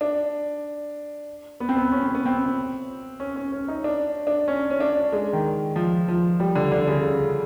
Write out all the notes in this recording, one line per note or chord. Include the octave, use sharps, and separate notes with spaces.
D4
B3
C4
B3
C#4
C4
B3
C4
C#4
C#4
C#4
D#4
D4
D4
C#4
C#4
D4
G#3
D#3
F3
F3
G3
D3
D3
C#3
C#3